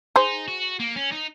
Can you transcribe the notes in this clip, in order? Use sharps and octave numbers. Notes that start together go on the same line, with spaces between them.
D#4 G#4 C5
F#4
A#3
C#4
D#4